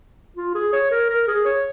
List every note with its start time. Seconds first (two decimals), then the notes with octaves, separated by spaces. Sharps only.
0.36 F4
0.54 G#4
0.73 C#5
0.91 A#4
1.09 A#4
1.27 G#4
1.45 C#5